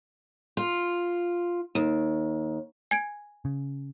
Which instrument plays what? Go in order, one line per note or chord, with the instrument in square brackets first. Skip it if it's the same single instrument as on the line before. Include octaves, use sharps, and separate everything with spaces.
[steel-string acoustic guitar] F4
D#2
[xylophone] G#5 G#6 D7
[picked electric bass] C#3